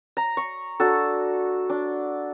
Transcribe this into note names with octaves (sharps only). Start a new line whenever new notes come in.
A#5
C#6
D4 F#4 A4
D4